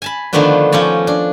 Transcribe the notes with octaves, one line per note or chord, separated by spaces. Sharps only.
G#5 A5 B5
D3 D#3 F3 A3 B3 D4
F3 C#4 D#4 C#5 D5
D4